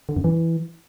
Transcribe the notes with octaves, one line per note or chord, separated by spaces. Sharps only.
D3
F#2
E3